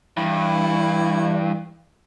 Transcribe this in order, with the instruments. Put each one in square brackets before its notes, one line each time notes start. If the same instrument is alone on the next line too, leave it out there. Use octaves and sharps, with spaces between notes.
[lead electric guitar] G2 [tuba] E3 [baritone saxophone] E4